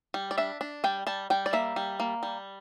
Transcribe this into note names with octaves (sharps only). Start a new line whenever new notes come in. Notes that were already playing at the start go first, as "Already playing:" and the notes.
G3
D5
D4 E5
D4
G3 G5
G3 A5
G3 G5
D5
A#3 E5
G3
A#3
G3